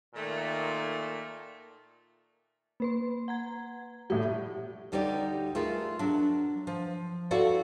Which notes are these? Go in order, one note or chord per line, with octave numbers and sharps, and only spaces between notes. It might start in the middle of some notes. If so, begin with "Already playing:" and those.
A#2 D#3 A3
A#3 B4 C6
F#5 A#5 G#6
A2 G3 F#5
D2 G3 D#4 G4 C#5 D5
A3 F4 G#4 A#4
F#3 D4
F3
E4 F#4 A4 D5 F5 F#5